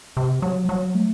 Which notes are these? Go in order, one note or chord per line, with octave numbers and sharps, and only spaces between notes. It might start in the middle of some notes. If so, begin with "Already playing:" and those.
C3
F#3
F#3
A3